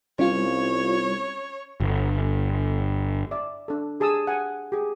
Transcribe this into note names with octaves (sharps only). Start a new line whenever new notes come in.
C2 G3 C#4 F4 C#5
G1
D5 E5
D4 A4
G4 G#4 A5 D#6 E6
F#5 G#5
G4 G#4